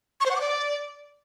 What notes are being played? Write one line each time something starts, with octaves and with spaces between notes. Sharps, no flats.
C#6
C5
F#5
D6
D5